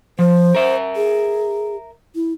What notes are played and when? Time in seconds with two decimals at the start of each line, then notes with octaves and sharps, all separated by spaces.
0.19 F3 C5
0.55 A#4 E5
0.96 G#4
2.15 E4